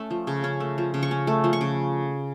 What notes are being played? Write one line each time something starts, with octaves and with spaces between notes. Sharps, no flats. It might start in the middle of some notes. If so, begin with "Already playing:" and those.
Already playing: A3 C#4
F3
C#3
C#4
A3
F3
C#3
C#6
C#4
A3
F3
C#6
C#3